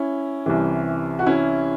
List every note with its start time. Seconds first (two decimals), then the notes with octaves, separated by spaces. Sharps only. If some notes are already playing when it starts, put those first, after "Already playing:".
Already playing: C#4 E4
0.46 C2 C3 E3
1.19 F#4
1.26 C#4 E4